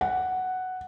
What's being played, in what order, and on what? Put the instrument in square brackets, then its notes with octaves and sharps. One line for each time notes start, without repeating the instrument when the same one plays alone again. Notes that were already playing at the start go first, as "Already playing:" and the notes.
[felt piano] F#5